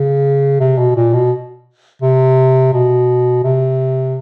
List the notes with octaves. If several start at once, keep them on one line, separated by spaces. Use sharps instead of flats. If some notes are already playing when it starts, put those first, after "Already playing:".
Already playing: C#3
C3
B2
A#2
B2
C3
B2
C3